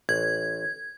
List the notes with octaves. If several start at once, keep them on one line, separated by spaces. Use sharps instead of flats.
A1 G#6